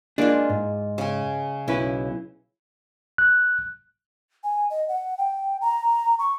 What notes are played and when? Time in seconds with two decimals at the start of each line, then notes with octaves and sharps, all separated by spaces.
0.18 G#3 A#3 D4 F4
0.50 G#2
0.98 C#3 G#5
1.68 B1 C#4 E4 B4
3.18 F#6
4.44 G#5
4.70 D#5
4.88 F#5
5.18 G5
5.61 A#5
6.19 C#6